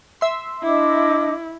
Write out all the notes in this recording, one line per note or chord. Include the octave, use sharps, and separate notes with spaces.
E5 C6
D4 E4 D#5 D6